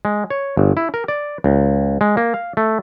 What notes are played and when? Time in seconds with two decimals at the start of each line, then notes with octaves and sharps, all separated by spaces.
0.05 G#3
0.30 C#5
0.57 G1
0.77 E4
0.94 A#4
1.08 D5
1.44 C#2
2.01 G#3
2.17 A#3
2.34 F5
2.57 A3